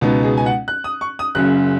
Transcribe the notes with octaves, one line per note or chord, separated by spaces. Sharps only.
C#2 B2 B3 D#4
G#4
G#5
F#5
F#6
D#6
C#6
D#6
F#1 F#2 C#3 F#6